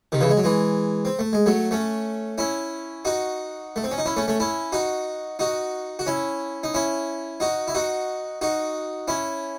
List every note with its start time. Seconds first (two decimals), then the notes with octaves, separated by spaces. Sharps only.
0.12 C3 D#3
0.21 C#3 E3
0.29 G#3
0.37 F#3
0.44 E3 G#3
1.05 C4
1.19 A3
1.33 G#3
1.46 F#3 A3
1.71 A3 C#4
2.38 C#4 E4
3.05 D#4 F#4
3.76 A3
3.84 C4
3.91 C#4
3.98 D#4
4.06 C#4 E4
4.16 A3 C#4
4.28 A3 C#4
4.40 C#4 E4
4.72 D#4 F#4
5.39 D#4 F#4
5.99 F#4
6.06 C#4 E4
6.63 D#4
6.74 C#4 E4
7.40 D#4 F#4
7.68 E4
7.75 D#4 F#4
8.41 D#4 F#4
9.08 C#4 E4